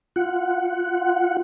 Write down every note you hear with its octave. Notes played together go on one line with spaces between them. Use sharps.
F4 F#5